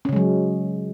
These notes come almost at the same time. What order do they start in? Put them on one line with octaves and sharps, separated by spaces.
C#4 C#3 G#3 F#3